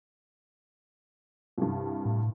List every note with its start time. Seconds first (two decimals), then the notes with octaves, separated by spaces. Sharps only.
1.58 C2 G2
2.05 A2